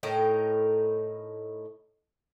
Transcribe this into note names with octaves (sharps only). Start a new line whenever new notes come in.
A2 D#4 A#4 G5